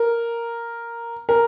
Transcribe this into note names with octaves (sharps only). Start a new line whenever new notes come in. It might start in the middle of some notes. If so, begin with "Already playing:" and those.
Already playing: A#4
A#4